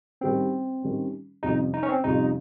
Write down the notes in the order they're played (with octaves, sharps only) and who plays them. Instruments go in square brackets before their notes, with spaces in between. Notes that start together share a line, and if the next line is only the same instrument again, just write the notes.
[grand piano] D#3 G3 C#4 [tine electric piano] C4
[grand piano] D#3 G3 C#4
[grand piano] F2 C3 G3 C#4 F4 [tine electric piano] D#4
[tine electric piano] D#4
C#4
C4
[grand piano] F2 C3 G3 C#4 F4 [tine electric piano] D#4